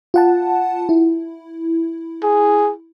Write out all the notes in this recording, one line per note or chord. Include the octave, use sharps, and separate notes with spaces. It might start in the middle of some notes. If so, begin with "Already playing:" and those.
F4 F#5 A5
E4
G#4